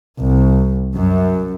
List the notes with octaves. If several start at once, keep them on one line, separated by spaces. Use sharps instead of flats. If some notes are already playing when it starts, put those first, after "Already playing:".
C2
F#2